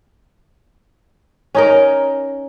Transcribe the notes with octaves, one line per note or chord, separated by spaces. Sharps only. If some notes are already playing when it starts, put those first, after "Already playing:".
C#4 D#4 A#4